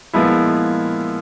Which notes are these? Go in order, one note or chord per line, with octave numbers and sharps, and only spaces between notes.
A#2 F3 G#3 B3 E4